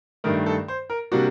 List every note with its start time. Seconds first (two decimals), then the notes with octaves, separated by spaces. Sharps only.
0.24 G2 D#3 A3 A#4
0.46 A4
0.68 C5
0.90 A#4
1.12 C3 G3 A#3 D4 F#4